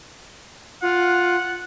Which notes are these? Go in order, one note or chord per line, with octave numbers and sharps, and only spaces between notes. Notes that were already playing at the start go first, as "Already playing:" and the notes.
F4 F#5